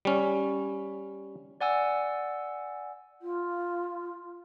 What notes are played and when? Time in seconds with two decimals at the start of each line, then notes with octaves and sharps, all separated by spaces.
0.05 G3 C#4
1.61 D5 F#5 G#5 E6
3.21 F4